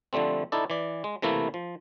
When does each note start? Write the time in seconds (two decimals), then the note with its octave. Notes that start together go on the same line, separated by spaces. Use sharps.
0.13 D3 F3 G3 A3 C4
0.52 D#4 E4 A4 D5
0.70 E3 D5
1.04 G#3
1.22 C3 E3 A3 A#3 E4
1.54 F3